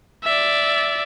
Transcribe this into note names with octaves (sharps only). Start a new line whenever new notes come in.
D5 E5